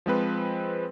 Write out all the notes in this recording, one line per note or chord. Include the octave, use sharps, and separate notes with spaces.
F3 G#3 C4 B4